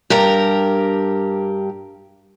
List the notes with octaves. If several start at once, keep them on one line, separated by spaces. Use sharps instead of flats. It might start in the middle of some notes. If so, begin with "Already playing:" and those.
G2 G4 A#4 A#5